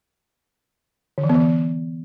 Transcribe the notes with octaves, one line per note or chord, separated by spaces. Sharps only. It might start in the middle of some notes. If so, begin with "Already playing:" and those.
D3
E3
B3
E3